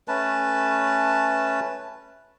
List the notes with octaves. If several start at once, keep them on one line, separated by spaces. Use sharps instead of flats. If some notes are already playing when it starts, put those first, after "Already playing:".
A3 C#4 B4 A5